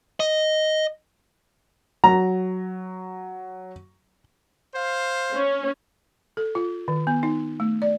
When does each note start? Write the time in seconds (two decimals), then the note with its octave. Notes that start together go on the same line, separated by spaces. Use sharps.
0.20 D#5
2.04 F#3 A#5
4.75 C5 F5
5.35 C#4
6.37 A4
6.55 F4
6.88 D#3
7.07 B3
7.23 D#4
7.60 A3
7.82 D5